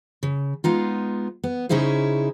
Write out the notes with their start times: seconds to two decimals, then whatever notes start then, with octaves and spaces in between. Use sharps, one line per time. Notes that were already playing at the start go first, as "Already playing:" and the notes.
0.23 C#3
0.64 G#3 B3 D#4 F4
1.44 B3
1.69 C#3 C#4 D#4 E4 G#4 C5